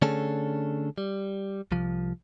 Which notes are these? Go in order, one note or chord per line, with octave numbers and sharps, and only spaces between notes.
D3 A3 C#4 D4 G#4 A4
G3
C2 F3